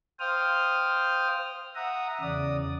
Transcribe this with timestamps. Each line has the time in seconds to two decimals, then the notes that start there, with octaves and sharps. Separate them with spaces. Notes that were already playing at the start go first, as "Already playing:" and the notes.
0.20 C5 F5 G5 D#6 F6
1.75 E5 F#5 A#5 D#6
2.21 E2 C#3 D5 D#6